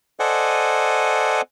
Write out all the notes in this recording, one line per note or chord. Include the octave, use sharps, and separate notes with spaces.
A4 C5 D5 D#5 F#5 G#5